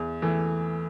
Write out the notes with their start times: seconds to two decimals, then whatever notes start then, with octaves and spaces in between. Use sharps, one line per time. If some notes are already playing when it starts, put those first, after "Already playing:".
Already playing: E2
0.22 E3 A3